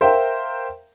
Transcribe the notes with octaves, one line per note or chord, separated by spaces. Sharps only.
A#4 C5 E5 F5 G5 A#5